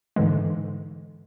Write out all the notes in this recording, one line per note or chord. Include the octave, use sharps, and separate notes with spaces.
G#2 D3 E3 G#3